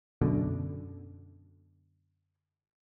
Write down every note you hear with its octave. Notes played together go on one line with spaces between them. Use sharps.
F#2 B2 D3